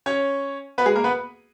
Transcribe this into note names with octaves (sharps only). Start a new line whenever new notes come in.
C#4 C#5
B3 B4
G#3 G#4
A#3 A#4
B3 B4